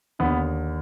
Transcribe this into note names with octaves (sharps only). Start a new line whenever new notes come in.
D#2 D3 B3